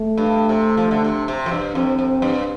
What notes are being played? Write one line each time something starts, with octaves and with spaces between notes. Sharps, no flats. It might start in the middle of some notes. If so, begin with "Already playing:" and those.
Already playing: A3
G2
C3
F3
D3
C3
C3
F2
G2
F2 C4
F2
G2